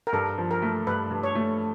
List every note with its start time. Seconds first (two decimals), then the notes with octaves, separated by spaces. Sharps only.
0.07 A#4
0.13 G2 A4
0.38 F3
0.51 A#4
0.62 A3
0.87 G2 B4
1.11 G2
1.23 C#5
1.35 A3